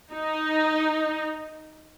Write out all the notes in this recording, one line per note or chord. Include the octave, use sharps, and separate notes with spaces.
D#4